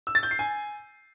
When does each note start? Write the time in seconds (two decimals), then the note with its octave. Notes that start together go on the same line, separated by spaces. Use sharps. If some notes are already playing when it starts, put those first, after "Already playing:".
0.07 E6
0.15 A6
0.23 G6
0.31 C7
0.39 G#5